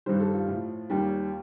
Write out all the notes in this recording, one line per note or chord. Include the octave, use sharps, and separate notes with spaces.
G2 D#3 G3 C5
A4
F4
A2 F3
D#2 D#3 G3